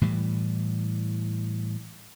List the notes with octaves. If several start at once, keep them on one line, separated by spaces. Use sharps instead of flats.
A2 E3 G3